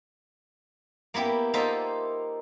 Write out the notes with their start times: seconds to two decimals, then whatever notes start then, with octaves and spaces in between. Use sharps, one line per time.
1.14 A#3 B3 E4 G4
1.54 A#3 D#4 F4 A4 C5 E5